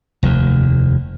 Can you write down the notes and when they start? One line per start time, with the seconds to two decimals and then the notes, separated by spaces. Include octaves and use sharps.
0.23 F1 D#2